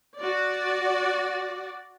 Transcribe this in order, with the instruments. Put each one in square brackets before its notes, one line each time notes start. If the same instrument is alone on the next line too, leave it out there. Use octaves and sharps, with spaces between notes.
[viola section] F#4 D5